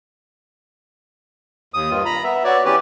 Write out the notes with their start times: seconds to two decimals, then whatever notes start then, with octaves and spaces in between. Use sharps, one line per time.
1.74 D#2 D#6
1.90 G2 D#3 F4
2.05 A#5 B5
2.24 B3 E5
2.44 B3 F#4 C#5 D5
2.65 E3 C#4 G4 B4 D5